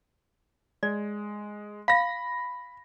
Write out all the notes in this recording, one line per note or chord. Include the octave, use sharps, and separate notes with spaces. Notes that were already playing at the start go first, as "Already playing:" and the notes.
G#3 D5
F5 B5 A#6